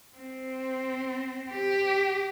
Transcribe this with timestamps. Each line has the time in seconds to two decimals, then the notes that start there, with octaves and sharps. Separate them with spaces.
0.17 C4
1.51 G4